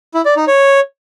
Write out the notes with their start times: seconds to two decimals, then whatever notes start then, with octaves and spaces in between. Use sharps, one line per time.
0.14 E4
0.25 D5
0.36 D#4
0.48 C#5